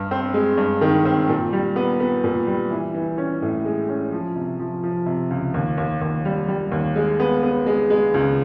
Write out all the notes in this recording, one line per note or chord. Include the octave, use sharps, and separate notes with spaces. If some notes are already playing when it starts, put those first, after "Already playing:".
Already playing: G2
C4
G#3
G2
D#3
C4
A#2
G3
B3
B3
A#2
G3
E3
E3
C#4
A2
G#3
C#4
F3
C3
F3
F3
C3
C#2
D#2
D#2
D#2
G3
G3
D#2
G#3
B3
B3
G#3
G#3
C#2